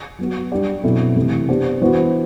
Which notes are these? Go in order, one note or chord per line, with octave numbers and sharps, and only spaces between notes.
F#3 B3 F#4
G3 D4 G4 D5
B2 F#3 C4 E4 A4
C3 E3 A3
B3 D4 G4 C5
E3 B3 F#4 C5